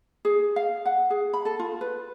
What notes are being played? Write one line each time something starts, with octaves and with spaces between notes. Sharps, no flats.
G#4
F5
F#5
G#4
B5
A4
F4
B4